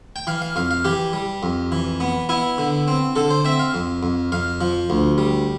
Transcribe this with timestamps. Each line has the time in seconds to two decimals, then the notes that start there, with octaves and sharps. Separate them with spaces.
0.16 G5
0.27 E3 F5
0.42 F5
0.56 F2 F5
0.71 F5
0.85 E3 G4
1.13 G3
1.43 F2
1.72 E3
2.00 B3
2.29 B3 E4
2.58 D3
2.88 C4
3.16 D3 A4
3.31 C5
3.45 C4 E5
3.59 F5
3.74 F2
4.03 F2
4.32 F2 F5
4.61 F3
4.90 D2
5.18 G3